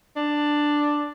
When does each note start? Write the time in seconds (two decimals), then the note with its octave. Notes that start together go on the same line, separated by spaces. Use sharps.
0.17 D4